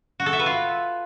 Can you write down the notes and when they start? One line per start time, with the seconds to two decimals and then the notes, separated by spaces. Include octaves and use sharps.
0.20 F#4
0.26 A4
0.33 E5
0.40 B4
0.46 F4